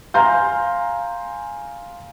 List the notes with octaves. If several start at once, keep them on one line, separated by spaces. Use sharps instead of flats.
F5 G#5 A#5 C6 F6 G6